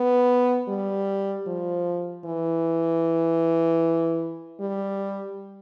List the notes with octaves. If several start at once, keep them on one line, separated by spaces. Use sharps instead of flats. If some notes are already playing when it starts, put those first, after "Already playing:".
Already playing: B3
G3
F3
E3
G3